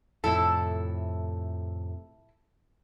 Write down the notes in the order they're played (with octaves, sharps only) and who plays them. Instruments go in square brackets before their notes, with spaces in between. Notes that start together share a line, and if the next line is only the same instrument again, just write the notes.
[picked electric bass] F2 A2 C3 [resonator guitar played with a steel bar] E4 A4